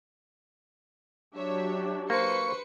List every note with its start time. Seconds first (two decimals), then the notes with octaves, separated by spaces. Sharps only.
1.35 F#3 D4 G4 C#5 E5
2.10 A#3 B4 C5 C#6 C#7